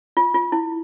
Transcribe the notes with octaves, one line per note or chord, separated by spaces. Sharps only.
F4
F4
E4